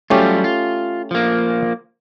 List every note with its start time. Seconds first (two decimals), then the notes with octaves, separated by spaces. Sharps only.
0.10 F#3 G3 A3 C#4 F4 G4
0.44 F4
1.11 F3 A#3